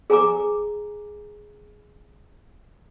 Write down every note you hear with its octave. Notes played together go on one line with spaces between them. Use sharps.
G#4 G#5 A#5 D6